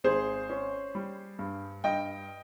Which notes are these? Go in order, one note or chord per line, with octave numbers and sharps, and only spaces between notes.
G#1 G#4 C5
C#4
G3
G2
G2 D#5 G5